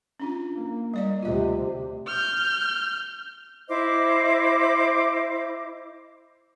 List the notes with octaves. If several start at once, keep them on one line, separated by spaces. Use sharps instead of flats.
C#4 D4 F4
A#3
G3 D5 D#5
D2 C3 F4 D#5
F6 G6
E4 C5 D#5 D6